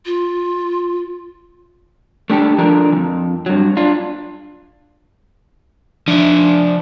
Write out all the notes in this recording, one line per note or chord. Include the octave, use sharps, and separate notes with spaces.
F4
A3 D4 G4 A4
F3 D4 A4 A#4
F2 E3
G2 F#3
D4 F4
F3 D4 E5